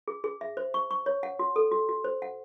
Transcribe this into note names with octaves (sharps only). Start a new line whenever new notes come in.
G#4
G#4
E5
C5
C#6
C#6
C#5
F#5
F#4
A4
F#4
F#4
C5
F#5